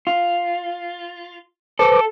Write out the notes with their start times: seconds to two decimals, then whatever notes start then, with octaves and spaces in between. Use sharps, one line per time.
0.07 F4
1.79 A4 B4 C5 D6